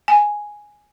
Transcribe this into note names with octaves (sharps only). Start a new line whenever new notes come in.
G#5